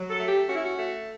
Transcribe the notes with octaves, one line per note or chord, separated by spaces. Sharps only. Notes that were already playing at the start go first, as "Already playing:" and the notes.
Already playing: F#3
A4
A3
G4
C#4 F#4
E4
F#4
A3